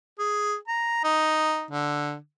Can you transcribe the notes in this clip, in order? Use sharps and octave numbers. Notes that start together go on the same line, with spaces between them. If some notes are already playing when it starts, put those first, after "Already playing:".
G#4
A#5
D#4
D3